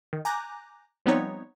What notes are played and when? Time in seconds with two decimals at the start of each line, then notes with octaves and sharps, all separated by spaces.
0.13 D#3
0.25 G#5 A#5 D6 F#6 G6 A#6
1.06 F3 G3 B3 C4 D#4 C#5